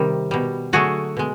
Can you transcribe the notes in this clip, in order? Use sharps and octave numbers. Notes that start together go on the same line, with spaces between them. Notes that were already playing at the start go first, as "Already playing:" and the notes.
Already playing: C3 D#3 G3
B2 G3
D3 F#3 A3 F#4 G#4
B2 G#3